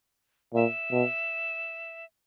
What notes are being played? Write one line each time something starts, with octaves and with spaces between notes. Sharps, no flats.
A#2 E5
B2